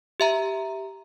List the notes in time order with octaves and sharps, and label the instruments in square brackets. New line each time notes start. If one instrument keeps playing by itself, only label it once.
[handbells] G4 E5 A#5